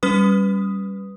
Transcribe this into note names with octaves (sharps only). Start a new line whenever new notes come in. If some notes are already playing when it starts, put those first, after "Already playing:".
G3 C#4 B4 D#6